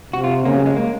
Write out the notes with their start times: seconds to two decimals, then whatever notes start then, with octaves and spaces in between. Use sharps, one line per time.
0.13 C3 F#4
0.24 F4
0.45 C#3 A#3
0.55 F#3
0.66 G#3
0.76 A#3